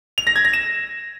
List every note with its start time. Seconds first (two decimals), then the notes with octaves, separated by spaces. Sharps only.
0.18 F7
0.27 A#6
0.36 G#6
0.45 A#6
0.53 E7